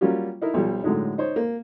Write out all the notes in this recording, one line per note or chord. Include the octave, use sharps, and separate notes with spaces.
F#3 G3 A#3 C#4 F4 G4
D#4 E4 A#4
B1 F3 G3
A2 D3 F#3 G#3 D#4
D#4 C5 C#5
A#3